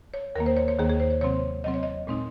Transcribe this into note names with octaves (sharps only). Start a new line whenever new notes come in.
C#5
D#2 D#3 A#3 A#4
C5
C#5
C#5
D#2 D#3 A#3 G#4
G#4
C5
C#5
C3 F#3 C4 C#5
C3 F#3 C4 D#5
C#5
D#5
A#2 G#3 C4 D#4